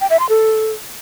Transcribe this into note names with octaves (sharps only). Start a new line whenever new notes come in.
G5
E5
C6
A4